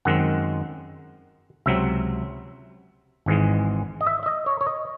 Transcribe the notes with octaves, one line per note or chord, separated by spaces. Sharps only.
F#2 D#3 G#3 C4 F#5
C#2 C3 F#3 C4 E5
G#1 G#2 E3 G#3
D#5
E5
E5
D#5
C#5
C#5
D#5